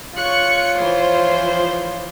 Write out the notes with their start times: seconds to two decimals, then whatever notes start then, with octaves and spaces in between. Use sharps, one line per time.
0.17 F4 C#5 C#6 F#6 C#7
0.78 E3 F3 C5